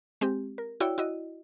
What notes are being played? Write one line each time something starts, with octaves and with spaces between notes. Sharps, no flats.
G#3 C4 G4
A#4
E4 F#4 C#5 D5 G5 E6
E4 F#4 D#5